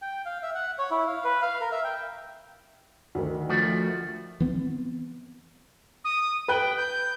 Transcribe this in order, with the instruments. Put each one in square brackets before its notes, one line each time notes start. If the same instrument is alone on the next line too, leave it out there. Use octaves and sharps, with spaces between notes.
[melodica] G5
F5
E5
F#5
C#5
E4
F5
B4
F5
A#4
E5
G5
[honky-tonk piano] D2 D#3
[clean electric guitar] F3 A3 F#4
[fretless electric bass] E3 B3 C4
[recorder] D#6
[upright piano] B4 F#6 G7 [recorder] G5
[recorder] G6